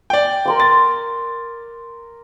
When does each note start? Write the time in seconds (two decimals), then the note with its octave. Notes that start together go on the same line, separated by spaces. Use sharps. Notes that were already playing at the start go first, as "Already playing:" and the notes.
0.10 D5 G5
0.45 A#4 C6 D6
0.60 A6